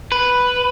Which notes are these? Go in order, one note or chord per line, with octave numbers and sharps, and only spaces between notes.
B4